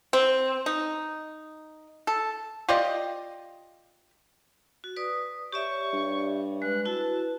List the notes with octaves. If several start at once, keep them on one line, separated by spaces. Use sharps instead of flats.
C4
D#4
A4
F4 G4 D5 D#5
F#4
B4 D5 D#6
G4 C#5 D5 E5 C#6
G2
G#3 B4 F#6
E4 F#4 A5